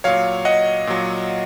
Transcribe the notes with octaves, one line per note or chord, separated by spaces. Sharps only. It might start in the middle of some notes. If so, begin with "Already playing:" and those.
A#2 F#3 C#5 F5
D#5 F#5
A#2 F#3